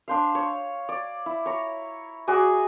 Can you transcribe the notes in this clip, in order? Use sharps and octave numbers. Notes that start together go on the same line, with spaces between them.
D4 C5 F5
C#5
D5
E4
C#5 A#5
F#4 G#4 D5 G#5